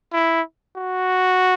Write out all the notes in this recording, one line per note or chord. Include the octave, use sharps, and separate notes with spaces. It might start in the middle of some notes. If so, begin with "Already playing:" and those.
E4
F#4